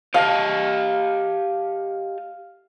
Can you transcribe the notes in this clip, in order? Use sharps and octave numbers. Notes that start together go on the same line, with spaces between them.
G4 D#5 F5 A5